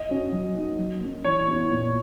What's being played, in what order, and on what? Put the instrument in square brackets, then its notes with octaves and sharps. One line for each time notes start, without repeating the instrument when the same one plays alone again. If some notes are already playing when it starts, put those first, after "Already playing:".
Already playing: [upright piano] D#5
[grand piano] C#4 F#4
F#3
A#3 D#4 F#4
F#3
A#3 C#4
[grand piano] E3 [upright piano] C#5
[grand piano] B3 E4
A#2